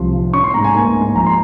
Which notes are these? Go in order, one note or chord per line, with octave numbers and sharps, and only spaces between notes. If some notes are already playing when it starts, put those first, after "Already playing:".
Already playing: C2 C3 F3 C6
F3
C#4 C#6
C6
G#2 A#5
G#5
A#3 G#5
G#2
F3 A#5
C6